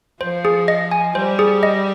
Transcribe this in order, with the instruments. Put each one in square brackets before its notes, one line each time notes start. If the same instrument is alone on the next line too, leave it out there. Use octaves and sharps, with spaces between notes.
[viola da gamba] F3 [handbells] C5
[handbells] G#4
D#5
G#5
[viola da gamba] G3 [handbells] C5
[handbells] G#4
D#5